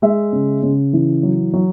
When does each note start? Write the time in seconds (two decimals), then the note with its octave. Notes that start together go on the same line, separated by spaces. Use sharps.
0.02 G#3 E5
0.33 C#3
0.63 C#3
0.93 E3
1.23 F#3
1.53 F#3